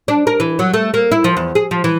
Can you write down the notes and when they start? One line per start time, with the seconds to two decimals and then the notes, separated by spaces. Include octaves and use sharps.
0.08 D4
0.27 A#4
0.40 E3
0.59 F#3
0.74 A3
0.94 A#3
1.11 E4
1.24 F3
1.37 E2
1.55 G#4
1.71 F3
1.84 E3